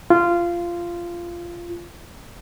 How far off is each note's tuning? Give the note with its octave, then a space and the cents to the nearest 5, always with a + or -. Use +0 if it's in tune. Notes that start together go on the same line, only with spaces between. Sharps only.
F4 -15